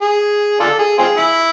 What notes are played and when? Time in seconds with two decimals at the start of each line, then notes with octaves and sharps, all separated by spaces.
0.02 G#4
0.60 D4 F4 A4
0.79 G#4
0.98 C4 F4 G#4
1.17 E4